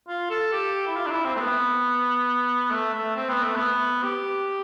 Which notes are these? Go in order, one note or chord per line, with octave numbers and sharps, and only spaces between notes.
F4
A4
G4
E4
F4
D4
E4
C4
A3
B3
A3
A3
C4
B3
A3
B3
G4